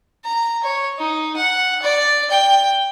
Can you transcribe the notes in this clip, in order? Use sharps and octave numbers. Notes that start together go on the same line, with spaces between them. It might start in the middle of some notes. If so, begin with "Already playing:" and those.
A#5
C#5
D#4
F#5
D5
G5